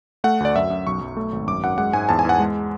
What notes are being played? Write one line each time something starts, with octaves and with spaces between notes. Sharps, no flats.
A3 F#5
D2 D5
F#2 E5
F#2
B1 C#6
B1
A3
G#1
F#2 D6
F#2 F#5
G#3 F#5
G#2 G#5
E2 A5
G#5
E2 F#5
G#3